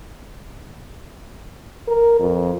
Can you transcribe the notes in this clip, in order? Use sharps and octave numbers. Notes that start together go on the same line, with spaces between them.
A#4
F2